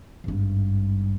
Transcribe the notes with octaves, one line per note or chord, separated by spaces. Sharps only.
G#1 G2